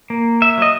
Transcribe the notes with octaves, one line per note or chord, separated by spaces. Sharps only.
A#3
E5
F#3 D#5